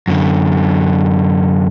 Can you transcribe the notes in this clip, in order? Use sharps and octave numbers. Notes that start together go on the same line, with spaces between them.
F#2 D3